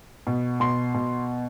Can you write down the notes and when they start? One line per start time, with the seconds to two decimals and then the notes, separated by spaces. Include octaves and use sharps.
0.27 B2
0.60 B2 C6
0.94 B2